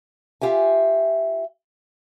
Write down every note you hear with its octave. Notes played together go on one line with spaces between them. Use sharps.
F4 G4 E5 G#5